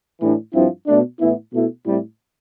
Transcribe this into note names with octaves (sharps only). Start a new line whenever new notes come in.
A2 E3 G3 D4
G2 F3 C4 E4
B2 A3 D4
A2 E3 B3 E4
B2 A3 E4
A2 G3 C4 E4